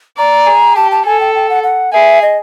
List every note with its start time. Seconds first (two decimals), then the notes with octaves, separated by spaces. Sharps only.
0.18 D5 A#5
0.47 G#4
0.76 G4 A5
0.91 A5
1.05 A4 G#5
1.20 G5
1.35 G5
1.50 F#5
1.63 F#5
1.93 G#4 E5
2.22 D#5